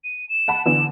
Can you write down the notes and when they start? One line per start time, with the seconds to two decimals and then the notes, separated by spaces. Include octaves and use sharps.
0.04 D#7
0.29 E7
0.48 F#5 A5 B5
0.66 D3 E3 B3 E7